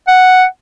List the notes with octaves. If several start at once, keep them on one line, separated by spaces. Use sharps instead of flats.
F#5